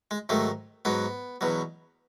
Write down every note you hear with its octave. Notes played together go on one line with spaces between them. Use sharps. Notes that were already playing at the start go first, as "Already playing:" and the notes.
G#3
G#2 D#3 F#3 A3
G#2 F#3 B3
E2 B2 F#3